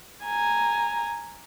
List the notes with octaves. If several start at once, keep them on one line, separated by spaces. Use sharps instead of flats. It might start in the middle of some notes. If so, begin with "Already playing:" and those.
G#5 A#5